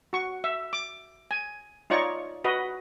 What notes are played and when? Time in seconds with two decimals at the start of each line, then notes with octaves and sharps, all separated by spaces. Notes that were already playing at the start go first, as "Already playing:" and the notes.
0.13 F#4 C#6
0.44 E5
0.73 D6
1.31 G#5
1.90 D#4 F4 C#5 D5 C#6
2.44 F#4 B4 D#5